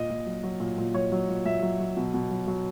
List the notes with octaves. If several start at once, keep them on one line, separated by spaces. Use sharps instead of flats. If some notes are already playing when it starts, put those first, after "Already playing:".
Already playing: A#2 D#5
A#2
F#3
F#3
A#2
A#2
F#3 C#5
F#3
A#2
A#2 E5
F#3
F#3
B2
B2
F#3
F#3